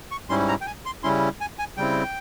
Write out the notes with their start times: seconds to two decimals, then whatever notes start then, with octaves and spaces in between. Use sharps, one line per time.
0.11 C#6
0.30 G#2 G3 C#4 E4 C6
0.48 A#5
0.61 G5
0.66 G#5
0.85 C6
1.03 C#3 G3 C#4 E4 C6
1.41 G#5
1.59 G#5
1.77 C#3 G3 C4 E4 G5